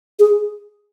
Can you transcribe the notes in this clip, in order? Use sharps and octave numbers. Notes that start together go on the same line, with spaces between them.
G#4